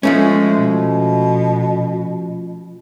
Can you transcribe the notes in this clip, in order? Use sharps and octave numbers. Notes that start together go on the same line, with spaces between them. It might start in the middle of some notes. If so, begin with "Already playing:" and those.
F3 G#3 A3 C#4
B2